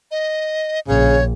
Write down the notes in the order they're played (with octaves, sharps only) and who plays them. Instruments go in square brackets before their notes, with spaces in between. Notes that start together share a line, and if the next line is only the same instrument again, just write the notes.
[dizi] D#5
[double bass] A#1 [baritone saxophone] C#3 [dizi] C#5